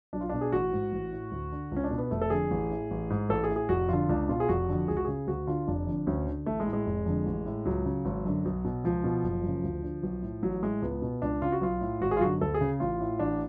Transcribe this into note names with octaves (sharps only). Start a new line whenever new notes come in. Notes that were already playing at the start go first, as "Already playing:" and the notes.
B1 D4
F4
B2 D4
G#4
A1 F#4
G#2
A1
A2
D2
D3
C#2 C#4
D4
B2
B3
F1 A3
A4
F2 D3 G#4
A1
A2
A1
G#2
A1 A4
G#4
A2
G#4
F1 F#4
F2 D3 F4
C#2 D4
B2 F4
G#4
F1 F#4
F2 D3
C#2 G#4
F#4
C#3 G#4
D2 F#4
D3 F4
F1 D4
F2 D3
D2 C#4
D3
A1 A3
G#3
A2
G#3
F1
F2 D3
A1
A2
C#2 F#3
C#3
G#1
F#2 D3
B1
B2
C#2 F3
B2
F#1
F#2 C#3
D2
D3
B1
A2
A1 F#3
A2 G#3
C#2 B3
B2
C#2 D4
C#3 F4
F#4
B1 F4
A2
G#1 F#4
G#4
F4
F#2 D3 F#4
D2 A4
G#4
C#3
A1 F4
A2
A1 D4